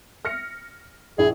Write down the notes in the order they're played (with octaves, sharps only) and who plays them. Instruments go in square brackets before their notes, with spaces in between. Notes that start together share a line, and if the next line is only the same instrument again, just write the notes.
[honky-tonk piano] F6 A#6 C#7
[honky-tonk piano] A#1 E4 [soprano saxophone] G#4